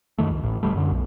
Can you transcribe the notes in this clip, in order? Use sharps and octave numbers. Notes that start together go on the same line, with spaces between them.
F#2 D#3 A3
C#2
A1 A2
D#1 D2 G3 A3
F#2 D3
B1